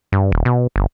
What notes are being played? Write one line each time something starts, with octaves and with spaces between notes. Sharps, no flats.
G2
D#1
B2
G1